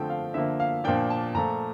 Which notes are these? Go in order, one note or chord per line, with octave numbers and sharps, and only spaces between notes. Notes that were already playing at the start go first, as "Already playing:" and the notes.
Already playing: D3 F3 A3 C4 G5
F5
D3 F3 A#3 E5
F5
A#2 F3 A#3 D4 G5
A5
A#2 F3 A3 A#5